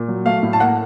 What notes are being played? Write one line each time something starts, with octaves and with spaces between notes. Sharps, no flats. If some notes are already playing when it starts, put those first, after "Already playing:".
Already playing: A#2
F#3
A3 F5
A2
A5
A#3 F#5